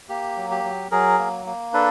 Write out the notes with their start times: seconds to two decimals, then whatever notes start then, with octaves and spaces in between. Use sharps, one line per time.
0.09 A#3 G4
0.37 F#3
0.51 G4
0.64 F#3
0.91 F#3 G#4 A#4
1.19 A#3
1.46 A#3
1.74 D4 A4 B4